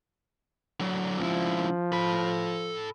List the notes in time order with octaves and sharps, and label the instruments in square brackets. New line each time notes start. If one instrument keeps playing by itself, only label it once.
[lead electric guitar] D3 F#3
[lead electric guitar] C#2 E4 [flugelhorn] F3
[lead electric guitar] A4 B5